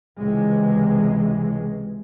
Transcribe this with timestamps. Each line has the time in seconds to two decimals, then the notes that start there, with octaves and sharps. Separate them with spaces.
0.19 C#2 C3 E3 G#3